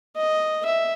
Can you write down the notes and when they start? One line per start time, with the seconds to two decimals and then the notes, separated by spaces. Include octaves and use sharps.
0.17 D#5
0.65 E5